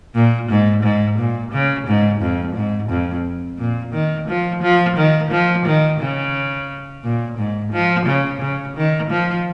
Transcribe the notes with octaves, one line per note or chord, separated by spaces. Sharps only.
A#2
G#2
G#2
A#2
C#3
G#2
F2
G#2
F2
A#2
D#3
F3
F3
D#3
F3
D#3
C#3
A#2
G#2
F3
C#3
C#3
D#3
F3